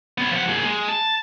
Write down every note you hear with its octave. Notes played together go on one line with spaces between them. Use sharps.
B3 C#5
F3 F#5
A#3 G#4
G#3
A5